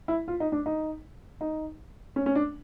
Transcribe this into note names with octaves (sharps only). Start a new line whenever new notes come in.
E4
F4
D#4
D4
D#4
D#4
C#4
C#4
D4